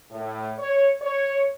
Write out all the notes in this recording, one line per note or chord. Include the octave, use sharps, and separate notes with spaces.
A2
C#5
C#5